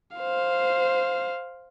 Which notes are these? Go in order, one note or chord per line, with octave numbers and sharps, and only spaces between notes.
C5 F5